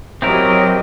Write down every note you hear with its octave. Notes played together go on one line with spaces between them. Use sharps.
F#3 C4 E4 G4 A#4 D#5